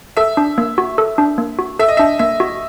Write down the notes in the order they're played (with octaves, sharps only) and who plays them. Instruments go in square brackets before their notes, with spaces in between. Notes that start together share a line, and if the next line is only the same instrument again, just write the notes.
[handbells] A4 [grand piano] E5
[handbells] D4
A#3
F#4
A4
D4
A#3
F#4
[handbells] A4 [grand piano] E5
[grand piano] D#5
[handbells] D4 [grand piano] E5
[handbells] A#3 [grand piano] E5
[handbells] F#4